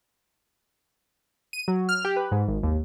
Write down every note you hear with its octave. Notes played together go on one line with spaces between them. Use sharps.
D#7
F#3
F6
G4
B4
G#2
G#1
D#2